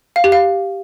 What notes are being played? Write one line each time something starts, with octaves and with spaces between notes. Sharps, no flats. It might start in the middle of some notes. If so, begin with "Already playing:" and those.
F5
G4
F5